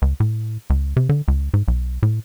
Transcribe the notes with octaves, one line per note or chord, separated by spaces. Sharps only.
C#2
A2
C#2
C3
D3
C#2
G#2
B1
A2